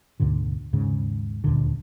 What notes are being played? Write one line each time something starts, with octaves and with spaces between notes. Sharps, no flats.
D2 G#2 B2 D3
D#2 G#2 C#3
D#1 D2 A#2 D3